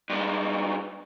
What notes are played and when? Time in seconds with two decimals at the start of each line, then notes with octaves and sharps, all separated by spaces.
0.10 G2 G#3